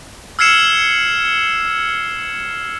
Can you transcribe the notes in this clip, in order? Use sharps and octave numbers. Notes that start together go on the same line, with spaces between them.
E6 F6 G#6 C7 C#7 E7